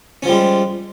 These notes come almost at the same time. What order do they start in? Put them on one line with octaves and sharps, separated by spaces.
C#4 F3 G3 G#3